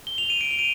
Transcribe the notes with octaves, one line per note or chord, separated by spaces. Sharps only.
G7
F7
D#7
D7
F7
D#7